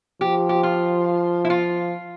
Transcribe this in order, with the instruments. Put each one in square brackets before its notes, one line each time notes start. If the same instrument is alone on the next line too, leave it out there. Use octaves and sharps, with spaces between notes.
[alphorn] F3 [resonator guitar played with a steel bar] G4
[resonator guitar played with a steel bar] G4
F4
E4
F4